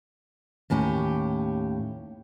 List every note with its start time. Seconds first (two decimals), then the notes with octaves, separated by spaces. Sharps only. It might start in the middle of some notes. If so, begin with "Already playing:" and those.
0.70 D#2 A2 C#4 G4